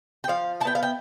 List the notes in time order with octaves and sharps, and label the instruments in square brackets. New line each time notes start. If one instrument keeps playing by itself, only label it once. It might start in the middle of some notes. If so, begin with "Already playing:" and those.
[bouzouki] G5
F3 F5
E4 A5
B3 G5
F5
G5